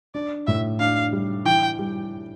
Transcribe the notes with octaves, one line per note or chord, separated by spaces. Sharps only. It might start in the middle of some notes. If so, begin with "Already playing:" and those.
D4 D5
A2 E5
D4 F5
G3
E3 G5
G3